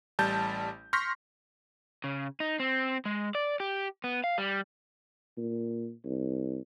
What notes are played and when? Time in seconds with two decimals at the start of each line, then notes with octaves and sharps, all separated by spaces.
0.19 A1 G3 A5 G6
0.93 C6 C#6 F6 G6 A#6 B6
2.04 C#3
2.40 D#4
2.60 C4
3.05 G#3
3.35 D5
3.60 G4
4.04 B3
4.24 F5
4.38 G3
5.37 A#2
6.04 C2